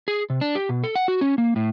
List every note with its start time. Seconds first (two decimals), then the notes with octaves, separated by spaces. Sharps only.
0.08 G#4
0.30 C3
0.41 D4
0.55 G4
0.69 B2
0.84 A4
0.96 F#5
1.08 F#4
1.21 C#4
1.38 A#3
1.56 A2